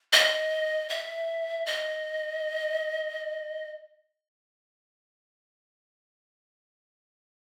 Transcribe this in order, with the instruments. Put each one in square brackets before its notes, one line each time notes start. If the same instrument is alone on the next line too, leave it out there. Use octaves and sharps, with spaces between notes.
[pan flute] D#5
E5
D#5